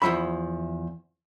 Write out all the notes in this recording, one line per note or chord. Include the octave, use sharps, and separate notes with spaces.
E2 G2 F3 E5 B5